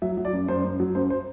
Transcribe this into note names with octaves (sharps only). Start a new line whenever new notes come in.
F#3 E5
F#3
D5
F#2
F#2 C5
F#2
F#3
F#2 C5
C5